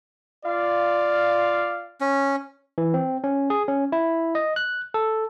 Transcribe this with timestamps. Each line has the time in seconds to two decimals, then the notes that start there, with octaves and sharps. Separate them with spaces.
0.45 F4 D5 F5
2.01 C#4
2.78 E3
2.94 C4
3.24 C#4
3.50 G#4
3.68 C#4
3.92 E4
4.35 D#5
4.56 F#6
4.94 A4